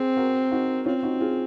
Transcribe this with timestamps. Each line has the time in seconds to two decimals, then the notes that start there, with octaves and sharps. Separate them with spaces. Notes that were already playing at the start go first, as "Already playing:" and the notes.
Already playing: C4 G#4
0.17 F#4 A#4
0.51 D#4 F#4
0.86 C4 C#4 F4
1.03 D#4 F#4
1.21 F4 G#4